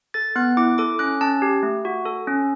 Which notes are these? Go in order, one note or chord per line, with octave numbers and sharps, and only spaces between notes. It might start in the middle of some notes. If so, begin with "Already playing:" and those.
A4 A6
B3 F#6
E4 D6
A4 D6
C#4 F#6
C#4 A5
G4
A3
F#4
A4
C#4